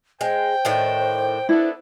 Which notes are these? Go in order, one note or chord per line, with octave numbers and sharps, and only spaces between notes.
G#3 C5 G5
A2 D#3 D4
B3 D4 E4 A4